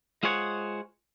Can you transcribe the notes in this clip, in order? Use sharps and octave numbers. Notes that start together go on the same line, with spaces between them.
G#3 F4 G#4 C5 C#5 F#5